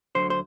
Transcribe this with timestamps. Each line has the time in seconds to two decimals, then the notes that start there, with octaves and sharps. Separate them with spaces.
0.15 D2 D3 F#3 C5
0.30 C5